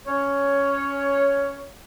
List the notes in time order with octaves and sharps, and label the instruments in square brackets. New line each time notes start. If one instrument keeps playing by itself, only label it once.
[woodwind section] C#4 C#5